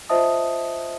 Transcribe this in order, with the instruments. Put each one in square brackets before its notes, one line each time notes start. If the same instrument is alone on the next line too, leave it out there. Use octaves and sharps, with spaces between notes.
[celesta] F4 C5 D#5 E5 A5 D#6